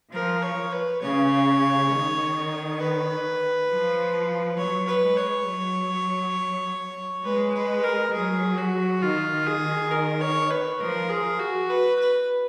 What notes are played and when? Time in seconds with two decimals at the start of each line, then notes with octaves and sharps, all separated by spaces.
0.13 F3 A#4
0.42 C#5
0.73 B4
1.02 C#3 C#5
1.91 D#3
2.80 B4
3.69 F3
4.57 F#3 C#5
4.88 B4
5.02 G#3
5.17 C#5
5.46 F#3
7.24 G#3 B4
7.54 B4
7.84 A#4
8.13 F#3 G#4
8.58 F#4
9.02 D#3 F4
9.32 D#3
9.47 G#4
9.62 D#3
9.91 A#4
10.21 C#5
10.51 B4
10.80 F3 A#4
11.10 G#4
11.39 F#4
11.70 B4
11.99 B4